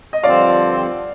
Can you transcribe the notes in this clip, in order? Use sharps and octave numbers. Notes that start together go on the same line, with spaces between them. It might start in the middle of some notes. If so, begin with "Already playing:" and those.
D#5
G2 D3 F3 C4 D5 F5